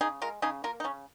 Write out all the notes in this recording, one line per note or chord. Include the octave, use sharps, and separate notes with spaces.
C#3 D#4 G#4
G#3 F4 A#4
C#3 D#4 G#4
A#3 F4 A#4
D#4
C#3 C#4